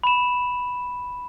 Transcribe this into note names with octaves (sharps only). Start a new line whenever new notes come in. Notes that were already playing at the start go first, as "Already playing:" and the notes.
B5 E7